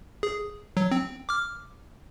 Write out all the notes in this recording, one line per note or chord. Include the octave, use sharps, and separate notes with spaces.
G#4
F#3
C4
D6 F6